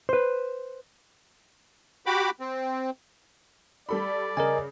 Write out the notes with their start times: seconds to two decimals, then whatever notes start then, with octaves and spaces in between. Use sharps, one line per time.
0.09 B4 C5
2.06 F#4 G4 B5 D6
2.40 C4
3.89 G3 A4 D5 B5
4.37 C#3 A#4 D#5 G#5